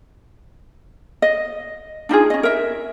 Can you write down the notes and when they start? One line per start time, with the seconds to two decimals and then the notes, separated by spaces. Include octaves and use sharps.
1.22 D#5
2.09 D4 D#4 F4 G#4
2.30 C#4 D#5
2.43 A#4 E5